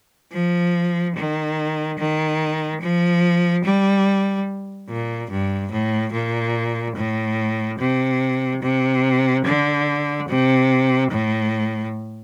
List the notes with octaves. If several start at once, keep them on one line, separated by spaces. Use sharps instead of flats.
F3
D#3
D#3
F3
G3
A#2
G2
A2
A#2
A2
C3
C3
D3
C3
A2